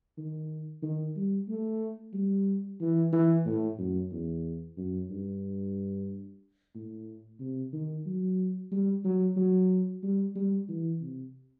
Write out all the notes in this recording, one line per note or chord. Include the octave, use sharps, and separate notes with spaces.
D#3
D#3
G3
A3
G3
E3
E3
A2
F#2
E2
F#2
G2
A2
C3
D#3
F#3
G3
F#3
F#3
G3
G3
E3
C3